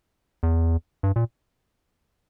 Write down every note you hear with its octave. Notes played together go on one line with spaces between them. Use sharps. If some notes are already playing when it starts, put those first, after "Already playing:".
E2
G2
A#2